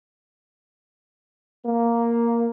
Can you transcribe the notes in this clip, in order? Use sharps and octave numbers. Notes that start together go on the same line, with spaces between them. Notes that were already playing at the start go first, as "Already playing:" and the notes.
A#3